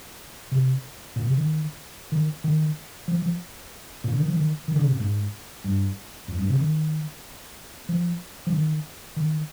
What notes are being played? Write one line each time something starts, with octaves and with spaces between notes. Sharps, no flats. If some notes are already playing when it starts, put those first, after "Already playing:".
C3
A#2
C3
D#3
D#3
D#3
F3
F3
A#2
D3
D#3
F3
D#3
D#3
D3
C3
A#2
G#2
G2
F2
G2
C3
D#3
F3
F3
D#3
D#3